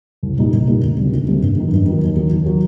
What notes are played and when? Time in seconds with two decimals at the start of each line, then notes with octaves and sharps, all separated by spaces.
0.23 C2
0.39 A#2 G3 A#3 D#4
0.53 C2
0.68 A#2 G3 A#3 D#4
0.83 D2
0.98 C3 G3 A#3
1.12 D2
1.28 C3 G3 A#3
1.42 G2
1.56 D#3 F#3 A#3 D#4
1.71 G2
1.86 D#3 F#3 A#3 D#4
2.02 D#2
2.16 D#3 F#3
2.31 D#2
2.46 D#3 F#3